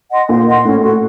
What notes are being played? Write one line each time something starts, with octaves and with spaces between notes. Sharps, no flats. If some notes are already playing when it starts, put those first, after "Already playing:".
D#5 F#5 C6
A#2 C5
D#5 F#5 C6
A2 C#4
F#4 A4